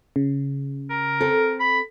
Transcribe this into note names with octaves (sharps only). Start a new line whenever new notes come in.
C#3
A#4
C4 A4
B5